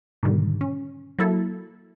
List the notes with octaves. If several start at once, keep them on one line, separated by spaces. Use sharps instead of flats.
G#2 B2 D3 D#3 G3
C#4
F#3 A#3 E4 A4